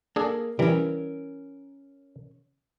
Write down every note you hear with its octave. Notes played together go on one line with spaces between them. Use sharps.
A#3 D4 G#4 A4
E3 G3 C#4 A#4